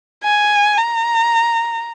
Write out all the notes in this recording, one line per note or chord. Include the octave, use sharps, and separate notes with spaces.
G#5
A#5